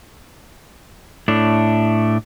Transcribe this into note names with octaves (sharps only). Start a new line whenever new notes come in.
A2 A3 D4